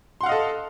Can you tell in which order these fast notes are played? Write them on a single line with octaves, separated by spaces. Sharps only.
C6 F#5 F5 D#5 A4